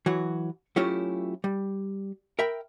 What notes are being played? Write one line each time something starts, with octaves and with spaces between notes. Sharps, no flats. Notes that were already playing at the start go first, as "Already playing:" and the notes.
E3 F#3 F#4
F#3 A3 C#4 E4 F4 G4
G3
A#4 E5 G5 B5